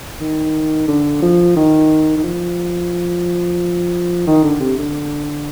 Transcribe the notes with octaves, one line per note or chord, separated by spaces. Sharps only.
D#3
D3
F3
D#3
D#3
F3
D#3
D3
C3
D3